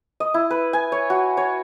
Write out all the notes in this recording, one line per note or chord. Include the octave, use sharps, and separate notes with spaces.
D#5
E4
B4
G#5
C#5
F#4
C#5